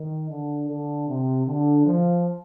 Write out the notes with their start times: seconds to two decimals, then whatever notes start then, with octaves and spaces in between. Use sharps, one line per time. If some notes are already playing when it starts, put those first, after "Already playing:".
Already playing: D#3
0.29 D3
0.69 D3
1.08 C3
1.47 D3
1.86 F3